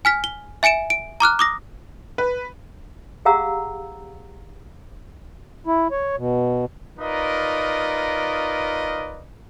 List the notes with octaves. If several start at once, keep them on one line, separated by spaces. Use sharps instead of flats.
G#5 F6 B6
G7
E5 G#5 C#7 D7 E7
D7
A#5 D6 F6 F#6
D6 D#6 A#6
B4
G4 G#4 F5 F#5 A#5 E6
E4
C#5
B2
D#4 F4 A#4 B4 D5 D#5